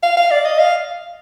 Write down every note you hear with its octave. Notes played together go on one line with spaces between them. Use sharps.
F5
F5
D5
D#5
F5